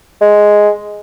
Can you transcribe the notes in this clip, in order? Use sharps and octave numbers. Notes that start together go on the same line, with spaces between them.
G#3